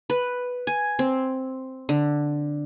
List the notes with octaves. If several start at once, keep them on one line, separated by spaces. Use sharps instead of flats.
B4
G#5
C4
D3